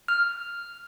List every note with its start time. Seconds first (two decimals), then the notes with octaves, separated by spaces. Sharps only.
0.08 F6